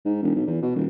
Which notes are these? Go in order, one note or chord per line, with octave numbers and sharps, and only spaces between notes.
G#2
E1
B1
E2
B2
D#1